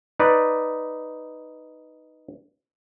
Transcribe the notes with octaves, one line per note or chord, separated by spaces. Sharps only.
D#4 B4 D5